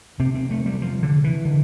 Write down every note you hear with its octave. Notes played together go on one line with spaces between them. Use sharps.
E2 C3 C4
C4
A3
G3
F3
D3
E3
D3